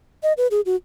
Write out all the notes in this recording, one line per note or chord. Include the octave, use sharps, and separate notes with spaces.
D#5
B4
G#4
F#4